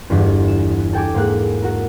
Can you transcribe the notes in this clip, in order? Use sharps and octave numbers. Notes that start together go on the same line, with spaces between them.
G1 E2 G2 D4
E7
A4 G5 G#5 D6
G#2 A#3 F#6
F#4 A#4